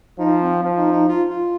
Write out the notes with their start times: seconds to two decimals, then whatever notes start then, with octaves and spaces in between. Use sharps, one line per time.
0.19 F3 D#4
0.41 C4
0.63 F3
0.78 D#4
0.93 D#4
1.08 F4
1.30 F4